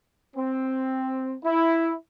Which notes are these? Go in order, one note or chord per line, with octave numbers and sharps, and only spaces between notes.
C4
E4